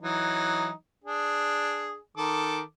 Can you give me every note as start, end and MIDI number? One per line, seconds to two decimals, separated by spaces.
0.02 0.71 52
0.02 0.71 54
0.02 0.71 63
1.04 1.97 62
1.04 1.97 68
2.17 2.61 51
2.17 2.61 69
2.17 2.61 86